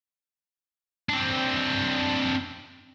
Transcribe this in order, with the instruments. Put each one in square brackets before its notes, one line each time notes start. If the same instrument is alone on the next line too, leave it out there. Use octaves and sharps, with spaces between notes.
[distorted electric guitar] C4 D4